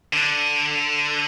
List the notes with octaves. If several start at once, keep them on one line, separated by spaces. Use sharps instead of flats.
D3